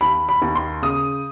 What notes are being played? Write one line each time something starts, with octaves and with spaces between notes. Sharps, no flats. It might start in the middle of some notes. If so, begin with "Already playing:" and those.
D#2 B5
B5
D#2
C6
C#3 D#6